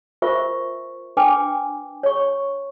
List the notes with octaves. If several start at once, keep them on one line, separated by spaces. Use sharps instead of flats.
F4 A#4 C5 E5 C#6
D4 B4 G5 G#5 D6
C#5 C#6